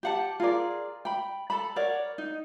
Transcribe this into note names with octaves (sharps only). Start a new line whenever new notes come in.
G4 F#5 A5
F4 G#4 A#4 D5
G5 B5
A4 A5 B5
A#4 C#5 D5 F#5
D#4